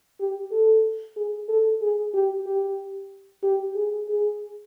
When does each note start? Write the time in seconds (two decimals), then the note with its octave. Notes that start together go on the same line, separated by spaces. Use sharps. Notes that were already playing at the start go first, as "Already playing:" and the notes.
0.20 G4
0.52 A4
1.17 G#4
1.49 A4
1.82 G#4
2.14 G4
2.46 G4
3.43 G4
3.76 G#4
4.08 G#4